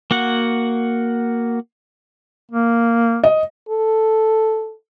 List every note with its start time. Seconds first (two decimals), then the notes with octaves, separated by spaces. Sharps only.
0.11 A#3 F#4 F#5
2.52 A#3
3.24 D#5
3.69 A4